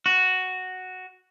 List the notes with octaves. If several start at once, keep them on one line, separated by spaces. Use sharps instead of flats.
F#4